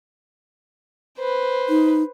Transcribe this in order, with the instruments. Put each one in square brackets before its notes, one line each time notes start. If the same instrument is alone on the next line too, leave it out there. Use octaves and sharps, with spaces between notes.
[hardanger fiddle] B4 C5
[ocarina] D#4